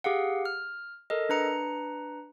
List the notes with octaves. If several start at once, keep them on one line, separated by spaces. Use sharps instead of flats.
G4 G#4 F5 F#5
F6
A4 A#4 D#5
D4 B4 A#5 C#7